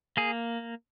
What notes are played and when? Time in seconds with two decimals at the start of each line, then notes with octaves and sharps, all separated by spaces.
0.17 A#3 G#4